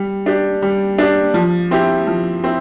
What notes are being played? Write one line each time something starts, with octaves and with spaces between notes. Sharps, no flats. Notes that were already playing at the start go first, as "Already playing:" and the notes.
Already playing: G3
D4 G4
G3
D4 G4
F3
C4 E4 G4
F3
C4 E4